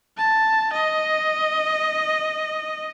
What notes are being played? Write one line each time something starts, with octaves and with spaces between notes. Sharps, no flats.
A5
D#5